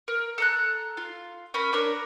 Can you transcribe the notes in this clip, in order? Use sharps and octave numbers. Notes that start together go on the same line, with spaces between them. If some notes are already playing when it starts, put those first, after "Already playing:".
A#4
A4 A#5 F#6
F4
C#4 A#4 B5
D4 A#4 C#5